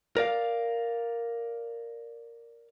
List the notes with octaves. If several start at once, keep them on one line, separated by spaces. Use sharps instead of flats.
A#4 D5 F5